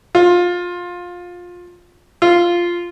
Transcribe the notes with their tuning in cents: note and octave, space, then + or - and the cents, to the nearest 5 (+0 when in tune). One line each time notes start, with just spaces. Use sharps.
F4 +20
F4 -5